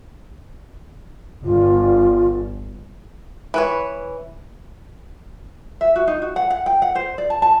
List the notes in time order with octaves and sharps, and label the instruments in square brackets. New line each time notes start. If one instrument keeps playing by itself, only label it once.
[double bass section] G1 [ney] F4
[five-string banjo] E3 B4 C#5
[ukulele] E5
F#4
D#4
F#4
F#5
F#5
G5
F#5
C5
D5
A5
A5